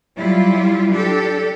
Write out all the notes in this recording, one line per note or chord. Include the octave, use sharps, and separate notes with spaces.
F#3 G3 E4 F4
D4 G4 A4